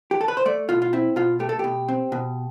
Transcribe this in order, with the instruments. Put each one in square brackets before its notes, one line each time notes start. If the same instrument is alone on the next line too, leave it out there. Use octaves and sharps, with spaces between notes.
[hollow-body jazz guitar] G4
A4
B4
C5
A3 D5
B2 F4
F4
C4 E4
B2 F4
A3 G4
A4
B2 G4
C4
B2